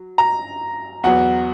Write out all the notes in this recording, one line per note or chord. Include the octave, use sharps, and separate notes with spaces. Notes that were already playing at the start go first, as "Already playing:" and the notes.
Already playing: F#3
A#5
E2 B2 F#3 B3 F#5